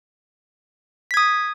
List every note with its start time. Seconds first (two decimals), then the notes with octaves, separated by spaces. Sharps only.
1.11 B6
1.14 G#6
1.17 D#6